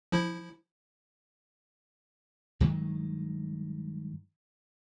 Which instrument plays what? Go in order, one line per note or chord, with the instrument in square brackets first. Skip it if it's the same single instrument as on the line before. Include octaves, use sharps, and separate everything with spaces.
[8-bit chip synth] F3 E4
[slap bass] G2 D#3 F#3 G#3